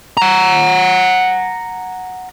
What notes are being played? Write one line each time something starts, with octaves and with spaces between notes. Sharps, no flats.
F#5 A#5